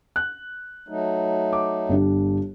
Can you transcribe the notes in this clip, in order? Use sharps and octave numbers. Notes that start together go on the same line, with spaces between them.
F#6
F#3 A3 D#4
D6
G1 D4 G4